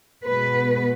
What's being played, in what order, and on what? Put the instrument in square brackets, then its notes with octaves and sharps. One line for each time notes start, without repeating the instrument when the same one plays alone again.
[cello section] B2 G#3 B3 B4